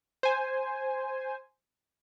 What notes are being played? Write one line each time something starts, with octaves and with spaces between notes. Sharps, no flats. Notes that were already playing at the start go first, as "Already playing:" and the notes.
C5 G#5